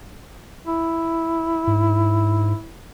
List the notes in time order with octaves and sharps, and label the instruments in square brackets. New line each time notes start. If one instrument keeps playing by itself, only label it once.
[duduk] E4
[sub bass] G#2